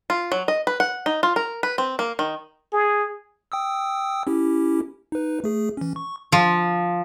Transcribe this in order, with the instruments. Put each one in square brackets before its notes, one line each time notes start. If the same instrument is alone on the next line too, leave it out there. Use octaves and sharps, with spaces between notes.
[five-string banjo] F4
F#3
D#5
B4
F#5
D#4
F4
A#4
B4
C4
A#3
D#3
[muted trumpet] G#4
[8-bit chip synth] G5 D#6 E6
C#4 E4 G4
D#4 B4
A3 G#4
E3 C#4
C#6
[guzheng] F3